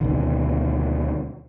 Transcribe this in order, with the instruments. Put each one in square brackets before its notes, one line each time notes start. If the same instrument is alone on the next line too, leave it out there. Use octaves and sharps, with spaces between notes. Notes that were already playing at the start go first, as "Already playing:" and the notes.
[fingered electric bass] D2 B2 D#3